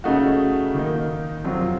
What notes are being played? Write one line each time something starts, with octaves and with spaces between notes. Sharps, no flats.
C#3 A3 D#4 F#4
D#3 A#3 D#4
F2 C3 F#3 C4 F4